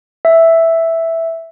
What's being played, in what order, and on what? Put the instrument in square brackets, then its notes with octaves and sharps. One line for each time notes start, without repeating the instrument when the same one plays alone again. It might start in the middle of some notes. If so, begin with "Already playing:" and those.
[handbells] E5